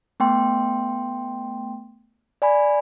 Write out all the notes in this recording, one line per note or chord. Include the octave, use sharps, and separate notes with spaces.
A3 B3 G5 C6
D5 G#5 B5